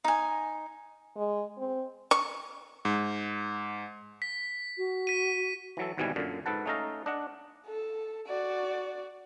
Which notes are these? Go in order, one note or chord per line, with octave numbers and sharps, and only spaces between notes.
D#4 G#5
G#3
C4
C#6
G#2
B6
F#4
B6 D#7
E3 F#3 A4
G#1 G#2 B2 E3 G3 G#5
F#2 A#2 D3
G#2 A4 B4 F#5 A5
A3 C#4 D#4 A4 F5 A#5
D4 D#5 F#5
A4
F#4 D5